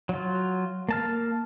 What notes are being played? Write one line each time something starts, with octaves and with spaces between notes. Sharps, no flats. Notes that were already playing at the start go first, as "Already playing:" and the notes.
F#3 F4
A#3 A5 F6